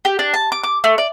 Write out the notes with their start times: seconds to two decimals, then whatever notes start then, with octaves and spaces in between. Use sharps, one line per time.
0.05 G4
0.19 D4
0.34 A5
0.52 D6
0.63 D6
0.84 A3
0.98 D5